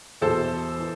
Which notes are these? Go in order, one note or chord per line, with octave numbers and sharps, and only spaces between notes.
E2 B2 A4 C5
E3